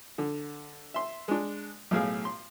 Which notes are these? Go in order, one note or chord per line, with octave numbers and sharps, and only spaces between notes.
D3
E5 C6
G#3 D4
B1 A2 G#4 F5
C6